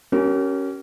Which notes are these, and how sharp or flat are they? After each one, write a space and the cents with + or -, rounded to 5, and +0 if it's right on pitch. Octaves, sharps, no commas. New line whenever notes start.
C#4 +0 G4 -40 A#4 +0